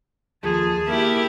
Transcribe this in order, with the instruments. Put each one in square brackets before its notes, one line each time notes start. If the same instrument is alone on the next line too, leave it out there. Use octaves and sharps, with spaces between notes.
[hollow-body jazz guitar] D#2 F3 A4 [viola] G#4 A5
[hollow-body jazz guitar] A#3 [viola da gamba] E4 G4